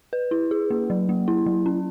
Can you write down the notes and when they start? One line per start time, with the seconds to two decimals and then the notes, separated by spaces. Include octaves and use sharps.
0.13 B4
0.31 E4
0.51 G#4
0.70 A#3
0.90 F#3
1.09 A#3
1.28 E4
1.46 F#3
1.66 C#4